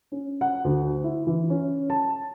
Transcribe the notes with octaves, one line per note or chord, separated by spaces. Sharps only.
C#4
F#5
D2
E4
E3
C#4
A5